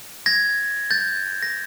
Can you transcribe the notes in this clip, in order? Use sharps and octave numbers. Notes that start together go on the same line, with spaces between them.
G#6 A#6
G6 A6
A#6